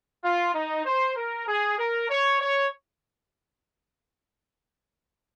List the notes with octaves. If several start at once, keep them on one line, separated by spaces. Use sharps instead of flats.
F4
D#4
C5
A#4
G#4
A#4
C#5
C#5